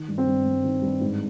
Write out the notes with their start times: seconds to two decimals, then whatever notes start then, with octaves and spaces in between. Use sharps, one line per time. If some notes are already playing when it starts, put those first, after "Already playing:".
Already playing: D#3
0.08 G2
0.18 C4
0.26 G2
0.45 G2
0.64 D#3
0.82 G2
1.01 G#2